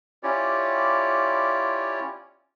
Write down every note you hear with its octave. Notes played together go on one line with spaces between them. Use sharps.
C#4 E4 F4 G4 C#5 D5